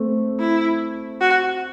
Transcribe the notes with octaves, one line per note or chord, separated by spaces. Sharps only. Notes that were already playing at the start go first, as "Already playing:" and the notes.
Already playing: A3 C4
E4
F#4